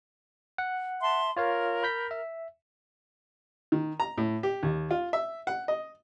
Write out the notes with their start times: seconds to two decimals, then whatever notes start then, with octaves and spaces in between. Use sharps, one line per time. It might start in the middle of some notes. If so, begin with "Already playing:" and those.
0.58 F#5
1.02 E5 A5 C6
1.37 F4 A#4 C#5 F5
1.83 B5 G6 B6
2.11 E5
3.72 D#3
4.00 A#5
4.18 A2
4.43 G4
4.63 D#2
4.91 F4
5.13 E5
5.47 F#5
5.68 D#5